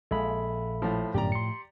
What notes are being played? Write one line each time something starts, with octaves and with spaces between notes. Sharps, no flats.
A#1 G#3 A4 E5 B5
A2 F3
G1 F#2 A2 F3 G4 D5 A#5
C6 C#7